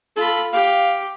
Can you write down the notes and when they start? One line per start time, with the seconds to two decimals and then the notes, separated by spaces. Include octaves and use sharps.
0.16 F4 A4 B5
0.53 G4 F5